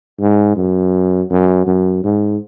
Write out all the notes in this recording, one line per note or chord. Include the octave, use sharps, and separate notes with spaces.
G#2
F#2
F#2
F#2
G#2